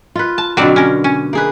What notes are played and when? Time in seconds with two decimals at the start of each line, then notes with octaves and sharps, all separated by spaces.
0.16 F4 B4
0.38 A5
0.57 B2 D3 F#3 C4 D5 F5
0.76 C#4 A#4
1.04 C#4
1.33 A#3 G#4 B4